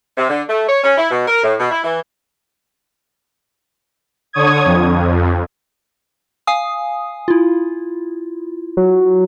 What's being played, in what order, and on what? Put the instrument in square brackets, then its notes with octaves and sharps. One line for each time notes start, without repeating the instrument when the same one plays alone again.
[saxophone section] C3
D3
A3
C#5
C#4
E4
B2
A#4
A2
B2
E4
E3
[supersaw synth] D3 C#5 D#6 G#6
F2
[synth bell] F5 G#5 D#6
E4 F4
[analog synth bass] F#3